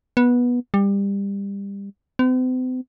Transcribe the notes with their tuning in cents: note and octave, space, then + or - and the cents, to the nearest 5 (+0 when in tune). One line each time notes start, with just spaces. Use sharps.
B3 -15
G3 +25
C4 -45